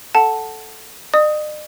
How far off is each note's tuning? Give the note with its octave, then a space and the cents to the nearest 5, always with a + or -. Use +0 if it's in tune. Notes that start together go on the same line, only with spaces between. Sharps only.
A4 +0 F#5 +0 A5 +0
D#5 -45 D#6 +5